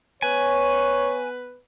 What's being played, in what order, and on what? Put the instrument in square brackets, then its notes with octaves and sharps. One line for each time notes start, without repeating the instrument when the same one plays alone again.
[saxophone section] B3 B4 [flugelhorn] C#5 [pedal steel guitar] G#5